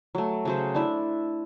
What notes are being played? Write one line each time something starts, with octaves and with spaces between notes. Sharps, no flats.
F#3 A3
C#3 F#3 C5
D4 E4 E5